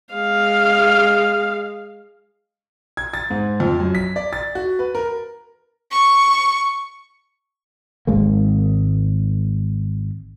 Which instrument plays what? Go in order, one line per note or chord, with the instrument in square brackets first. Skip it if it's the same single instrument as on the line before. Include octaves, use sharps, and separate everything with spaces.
[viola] G#3 F5
[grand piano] G#6
A6
G#2
F2
F#2
B6
D5
A6
F#4
B4
A#4
[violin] C#6
[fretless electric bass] G#1 G#3 A#3